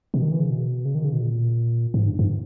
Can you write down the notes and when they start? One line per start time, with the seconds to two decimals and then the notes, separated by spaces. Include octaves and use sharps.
0.14 B2
0.22 D#3
0.32 E3
0.40 C#3
0.50 B2
0.85 C#3
0.95 D#3
1.04 C#3
1.13 B2
1.21 A#2
1.94 G#2
2.06 G2
2.19 G2